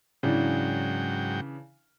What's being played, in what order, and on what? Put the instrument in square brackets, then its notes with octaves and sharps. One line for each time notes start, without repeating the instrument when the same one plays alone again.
[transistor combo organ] G#2 F#3 G5 [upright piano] C#3 E3 D4